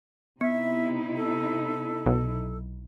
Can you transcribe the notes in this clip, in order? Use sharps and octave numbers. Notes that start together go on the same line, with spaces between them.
C3 B3 D#4 E4 E5
A4
B1